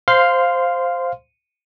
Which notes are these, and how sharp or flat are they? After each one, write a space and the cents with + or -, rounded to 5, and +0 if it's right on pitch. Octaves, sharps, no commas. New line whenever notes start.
C5 +0 F5 +0 C6 -15